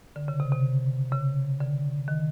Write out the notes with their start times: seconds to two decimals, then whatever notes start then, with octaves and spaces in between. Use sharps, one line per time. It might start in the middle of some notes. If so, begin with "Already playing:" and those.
0.16 D3
0.28 C#3
0.40 C3
0.52 C3
1.12 C#3
1.60 D3
2.08 D#3